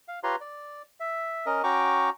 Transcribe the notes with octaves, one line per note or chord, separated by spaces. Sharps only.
F5
F4 G4 B4 C#5 A#5 C6
D5
E5
C#4 A#4 D#5
C#4 F#4 G5 A#5 C#6 D6